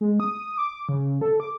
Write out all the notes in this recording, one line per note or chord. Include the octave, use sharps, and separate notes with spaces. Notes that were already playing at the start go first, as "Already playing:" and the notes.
G#3
D#6
D6
C#3
A4
D6